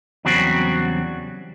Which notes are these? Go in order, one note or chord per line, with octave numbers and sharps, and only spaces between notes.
E2 C#3 F#3 G3 C4 F#4